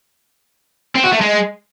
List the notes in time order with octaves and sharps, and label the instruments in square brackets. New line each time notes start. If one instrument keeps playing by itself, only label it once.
[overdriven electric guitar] C4
F#4
A3
G#3